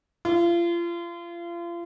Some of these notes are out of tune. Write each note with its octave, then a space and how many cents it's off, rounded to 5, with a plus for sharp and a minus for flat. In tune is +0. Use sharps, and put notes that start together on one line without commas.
F4 -35